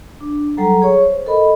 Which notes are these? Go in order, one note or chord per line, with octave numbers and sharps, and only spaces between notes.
D4
F#3 G3 A4 F#5 A#5
G#4 C#5 C#6
C5
A4 A#4 D#5 B5